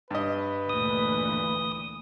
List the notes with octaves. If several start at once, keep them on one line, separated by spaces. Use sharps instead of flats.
G2 B4 D#5
D2 A#2 E3 D#6